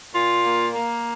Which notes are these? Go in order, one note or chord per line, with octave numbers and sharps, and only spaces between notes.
A#2 F4
A#3
A#3